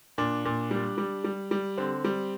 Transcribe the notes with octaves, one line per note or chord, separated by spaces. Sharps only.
A#2 D4
A#2
G3
G3
G3
G3
D3 C4
G3